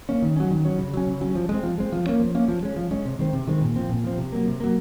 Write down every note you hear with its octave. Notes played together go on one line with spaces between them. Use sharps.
A#3 C#4
D#3
F#3 C#4
D#3
F#3 C#4
C#3
F#3 C#4
C#3
F#3 C#4
F3
G#3
C4
F3
G#3 C4
F3
A#3 C#4
F3
A#3 C#4
F3
G#3 C#4
F3
G#3 C#4
C3
D#3 G#3 C4
C3
D#3 G#3 C4
A#2
F3 C4
A#2
F3 C4
C3
F#3 A#3
C3
F#3 A#3